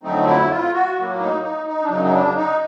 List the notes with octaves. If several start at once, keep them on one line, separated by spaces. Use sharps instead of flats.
F2 D3 F#3 A3 C4 D#4
E4
F4
F#4
A2 F#3 A#3
D#4
D#4
D#4
D4
F#2 C#3 F#3 D#4
D#4
D4
D#4